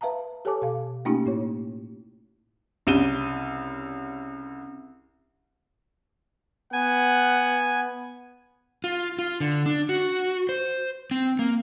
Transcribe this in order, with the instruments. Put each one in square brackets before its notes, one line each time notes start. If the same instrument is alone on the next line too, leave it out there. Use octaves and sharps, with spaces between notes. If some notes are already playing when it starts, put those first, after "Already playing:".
[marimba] B4 E5 F5 A5 A#5
G4 A4 C#5 G#5 A5 D6
B2 F5
A3 A#3 C#4 D#4 F4 G4
A2 E4 C#5
[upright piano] C2 C#3 D4 D#7 G7
[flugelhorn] B3 [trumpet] F#5 [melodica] G#5
[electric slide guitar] F4
F4
D3
D4
F#4
C5
C4
A#3